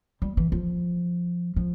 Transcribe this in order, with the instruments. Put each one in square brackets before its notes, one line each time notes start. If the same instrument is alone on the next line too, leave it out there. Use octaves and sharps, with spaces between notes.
[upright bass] G3
E3
F3
F3